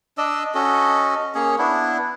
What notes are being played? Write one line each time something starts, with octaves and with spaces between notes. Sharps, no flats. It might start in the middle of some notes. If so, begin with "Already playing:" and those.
D4 D5 D#5 E6
C#4 F#4 A4 D#5
A#3 C#4 G#4 C#5
B3 D4 E4